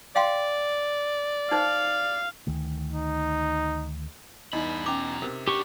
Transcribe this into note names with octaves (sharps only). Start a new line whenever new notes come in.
D5 F5 G5 C6
D#4 C5 F5
D2 D#3 A3
D#4
E2 G2 D#4 D#5 B5
B2 C#4 A#5 D6
C3 A#4
B3 D4 G4 C#6